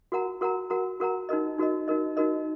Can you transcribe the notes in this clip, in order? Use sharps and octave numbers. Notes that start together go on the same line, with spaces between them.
F#4 A#4 F#5 A#5
F#4 A#4 F#5 A#5
F#4 A#4 F#5 A#5
F#4 A#4 F#5 A#5
D#4 F#4 A#4 D#5
D#4 F#4 A#4 D#5
D#4 F#4 A#4 D#5
D#4 F#4 A#4 D#5